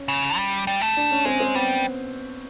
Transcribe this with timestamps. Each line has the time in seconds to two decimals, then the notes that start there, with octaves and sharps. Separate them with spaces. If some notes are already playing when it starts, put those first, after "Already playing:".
Already playing: C#4
0.08 C#3
0.37 G3
0.67 G3
0.81 A3
0.97 D4
1.11 C#4
1.25 G#3 C4
1.35 C#4
1.40 C4
1.55 G3 B3